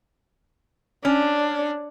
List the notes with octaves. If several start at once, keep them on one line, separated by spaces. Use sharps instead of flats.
C#4 D4